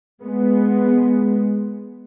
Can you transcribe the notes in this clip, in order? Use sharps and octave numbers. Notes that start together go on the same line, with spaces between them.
G#3 B3